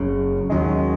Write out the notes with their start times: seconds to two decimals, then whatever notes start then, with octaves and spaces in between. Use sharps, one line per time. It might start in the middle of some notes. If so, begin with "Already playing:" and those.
Already playing: F#1 F#2 C#3
0.50 D#2 D#3 F#3 G#3 C#4